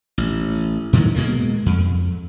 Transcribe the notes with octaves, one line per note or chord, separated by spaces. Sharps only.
A1
A2 D#3 F#3
B2 G#3 A#3
F2